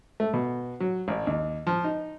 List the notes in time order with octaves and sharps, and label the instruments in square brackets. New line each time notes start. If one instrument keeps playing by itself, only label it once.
[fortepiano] A3
B2
F#3
A1
D#2
F3
D#4